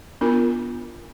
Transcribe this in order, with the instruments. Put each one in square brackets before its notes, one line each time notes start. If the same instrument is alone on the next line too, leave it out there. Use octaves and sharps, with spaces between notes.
[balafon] B3 D4 F4 A#4